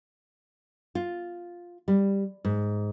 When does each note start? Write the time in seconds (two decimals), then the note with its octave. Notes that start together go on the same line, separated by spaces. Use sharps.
0.95 F4
1.88 G3
2.45 G#2